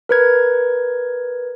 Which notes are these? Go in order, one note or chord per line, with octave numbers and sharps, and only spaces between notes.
A#4 B4 G#6